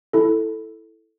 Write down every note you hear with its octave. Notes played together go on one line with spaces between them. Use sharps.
E4 A4